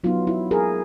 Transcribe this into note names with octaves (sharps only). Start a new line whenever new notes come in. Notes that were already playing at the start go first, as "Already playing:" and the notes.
F#3 B3 D#4 F4
E4
G#4 A#4